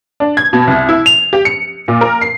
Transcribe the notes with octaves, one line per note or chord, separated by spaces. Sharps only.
D4
G#6
B2
C2
E4
F7
G4
C#7
A#2
A#4
C7